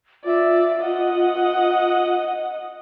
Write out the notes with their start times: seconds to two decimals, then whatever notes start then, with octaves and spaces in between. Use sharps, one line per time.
0.25 F4 D5 E5
0.80 D#5 F#5